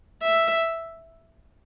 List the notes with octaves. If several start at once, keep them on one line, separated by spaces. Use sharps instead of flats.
E5